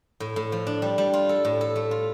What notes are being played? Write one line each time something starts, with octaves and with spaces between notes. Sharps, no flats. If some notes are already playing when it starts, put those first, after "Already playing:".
A2
A2
F3
D4
G3
G3
F4
A4
A2
A4
A3
F4